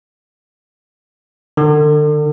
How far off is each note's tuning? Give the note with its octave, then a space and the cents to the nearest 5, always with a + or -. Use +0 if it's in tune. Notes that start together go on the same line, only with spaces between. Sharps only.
D3 +35